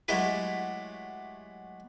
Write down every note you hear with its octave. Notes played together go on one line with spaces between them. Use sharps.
F#3 G#3 A3 E4 G4